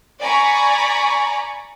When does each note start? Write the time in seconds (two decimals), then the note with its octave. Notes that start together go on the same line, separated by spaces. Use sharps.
0.20 D5 G#5 A#5 B5 C#6